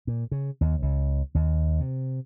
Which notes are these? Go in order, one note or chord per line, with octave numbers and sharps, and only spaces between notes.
A#2
C#3
D#2
C#2
D#2
C3